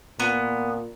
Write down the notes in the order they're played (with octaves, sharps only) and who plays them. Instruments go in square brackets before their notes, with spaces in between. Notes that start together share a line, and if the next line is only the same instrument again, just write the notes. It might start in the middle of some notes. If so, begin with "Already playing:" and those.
[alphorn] A#2 [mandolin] B3